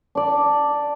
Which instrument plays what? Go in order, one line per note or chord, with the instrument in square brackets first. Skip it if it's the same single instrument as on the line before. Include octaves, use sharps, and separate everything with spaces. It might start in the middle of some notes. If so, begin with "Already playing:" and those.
[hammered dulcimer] D4 D5